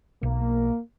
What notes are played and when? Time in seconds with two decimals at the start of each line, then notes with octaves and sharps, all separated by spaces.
0.23 B1 A#3